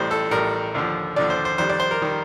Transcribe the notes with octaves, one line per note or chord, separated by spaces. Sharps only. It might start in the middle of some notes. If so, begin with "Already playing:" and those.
Already playing: A1 A2 G3 C5
A4
A1 A2 G3 A#4
D#2 D3 F3
D#2 D3 F3 D5
C5
C5
F2 D#3 G3 C5
D5
C5
A#4
D#3 G3